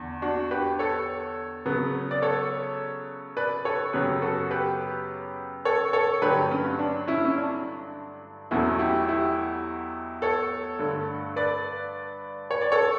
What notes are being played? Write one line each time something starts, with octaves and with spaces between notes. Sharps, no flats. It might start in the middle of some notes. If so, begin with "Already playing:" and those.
Already playing: E2 D3
D4 F#4
G4 B4
A4 C#5
C#3 F#3 B3
D5
A4 C#5
B4 D5
A4 C#5
F#2 C#3 F#3 B3 G4 B4
F#4 A4
G4 B4
A4 C#5
A4 C#5
G2 D3 F#3 A3 G4 B4
C#4
D4
C#4 E4
C#4
D4
E2 B2 F#3 A3 C#4 E4
E4 G4
E4 G4
A4 C#5
G2 D3 A3
B4 D5
C#5
D5
A4 C#5